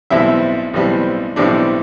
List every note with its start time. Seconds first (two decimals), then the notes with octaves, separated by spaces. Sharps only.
0.10 B1 A2 E3 G3 C4 E4 E5
0.74 B1 A2 E3 G3 C4
1.36 B1 A2 E3 G3 C4 D4 D5